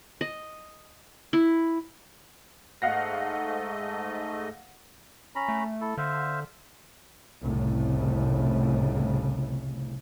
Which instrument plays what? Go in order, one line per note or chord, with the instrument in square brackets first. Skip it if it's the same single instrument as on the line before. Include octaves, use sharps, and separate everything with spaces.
[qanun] D#5
E4
[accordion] G#2 A3 D#5 [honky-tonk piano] F5 F#5 A#6
[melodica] C#4 A#5 B5
[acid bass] A3
[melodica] E4 A4
[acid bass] D3 [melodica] C5 E5 F5
[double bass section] F1 C2 A2 C#3